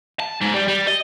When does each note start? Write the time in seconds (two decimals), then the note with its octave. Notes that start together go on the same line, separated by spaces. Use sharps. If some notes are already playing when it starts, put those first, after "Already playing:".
0.20 A5
0.41 G#2
0.54 G3
0.68 G3
0.87 D#5